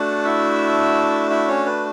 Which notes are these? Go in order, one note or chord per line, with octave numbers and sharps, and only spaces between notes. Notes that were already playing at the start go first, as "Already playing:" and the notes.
Already playing: A3 D4 F#4 F#5
E4 E5
E4 E5
C#4 C#5
B4